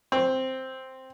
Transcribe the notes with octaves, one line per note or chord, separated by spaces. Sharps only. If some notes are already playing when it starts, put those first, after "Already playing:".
C4